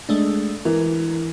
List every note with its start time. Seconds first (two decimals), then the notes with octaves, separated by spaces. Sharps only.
0.09 G#3 A3 D4
0.65 E3 A#4